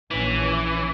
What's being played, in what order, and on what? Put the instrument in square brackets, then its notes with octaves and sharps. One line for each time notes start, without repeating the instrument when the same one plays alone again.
[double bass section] A#1 C#4 [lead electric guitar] E3